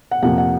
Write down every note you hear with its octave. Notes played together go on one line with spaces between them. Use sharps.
F#5
F2 C3 F3 A#3 F#5
F#5